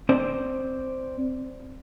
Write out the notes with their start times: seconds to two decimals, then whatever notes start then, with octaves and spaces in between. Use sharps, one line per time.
0.09 C4 C5 D5